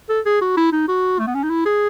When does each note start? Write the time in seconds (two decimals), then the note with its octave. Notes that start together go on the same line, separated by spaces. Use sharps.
0.09 A4
0.25 G#4
0.41 F#4
0.57 E4
0.72 D#4
0.88 F#4
1.19 A3
1.27 B3
1.35 C#4
1.43 D#4
1.50 E4
1.66 G#4